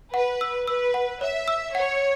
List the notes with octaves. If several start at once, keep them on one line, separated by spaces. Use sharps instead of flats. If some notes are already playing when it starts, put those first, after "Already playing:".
B4 F#5
E6
B4 E6
F#5
C#5 E5
E6
C#5 F#5